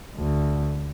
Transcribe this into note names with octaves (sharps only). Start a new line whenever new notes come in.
D2